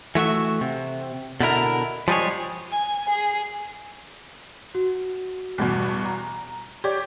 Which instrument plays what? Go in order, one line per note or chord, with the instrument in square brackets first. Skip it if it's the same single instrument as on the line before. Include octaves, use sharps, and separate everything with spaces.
[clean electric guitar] E3 A3 F#4 E5
C3
B2 D3 E4 A#4
F3 G3 G#3 G#4 C#5
[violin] G#5
G#4
[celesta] F#4
[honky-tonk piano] E2 G2 B2
A#5
[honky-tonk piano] G4 C#5 D5 [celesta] D6 G#6